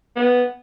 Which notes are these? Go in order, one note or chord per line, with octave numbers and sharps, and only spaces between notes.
B3